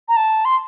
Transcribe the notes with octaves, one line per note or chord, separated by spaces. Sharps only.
A#5
A5
C6